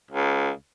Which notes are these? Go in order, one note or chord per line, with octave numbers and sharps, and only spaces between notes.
C#2